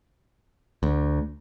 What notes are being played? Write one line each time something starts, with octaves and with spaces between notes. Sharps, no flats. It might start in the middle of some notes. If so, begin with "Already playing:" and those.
D2